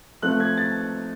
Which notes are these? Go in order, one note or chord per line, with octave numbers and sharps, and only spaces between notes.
F3 A3 C4 F#6
G#6
A6